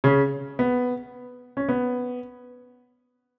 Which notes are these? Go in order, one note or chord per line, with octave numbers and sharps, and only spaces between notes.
C#3 C#4
B3
C#4
B3